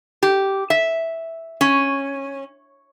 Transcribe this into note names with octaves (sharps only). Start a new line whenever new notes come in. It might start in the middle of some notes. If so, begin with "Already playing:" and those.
G4
E5
C#4